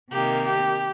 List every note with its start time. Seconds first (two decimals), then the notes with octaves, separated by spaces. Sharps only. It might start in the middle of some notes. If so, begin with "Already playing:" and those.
0.11 C3 D#3 A#3 G4
0.46 G4